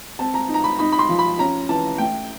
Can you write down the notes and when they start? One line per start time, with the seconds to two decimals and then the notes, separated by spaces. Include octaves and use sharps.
0.19 C4 A5
0.34 A#5
0.49 D#4
0.54 A#5
0.64 B5
0.79 D#4 B5
0.92 B5
0.99 C6
1.09 F3
1.19 B5
1.39 C#4 A#5
1.69 E3 A5
1.98 A3 G5